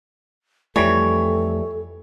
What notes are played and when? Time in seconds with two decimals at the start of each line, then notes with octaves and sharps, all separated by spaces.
0.76 F2 E3 G3 A3 A4 C#5